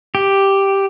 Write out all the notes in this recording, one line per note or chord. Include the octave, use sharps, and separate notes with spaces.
G4